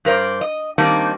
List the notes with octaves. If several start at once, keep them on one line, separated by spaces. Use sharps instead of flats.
G2 A#4 C5 D5
D#5
D#3 G3 A#3 C4 D4 D#4